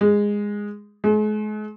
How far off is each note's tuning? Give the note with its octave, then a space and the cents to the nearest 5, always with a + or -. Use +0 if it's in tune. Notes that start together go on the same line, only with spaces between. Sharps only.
G#3 -10
G#3 +40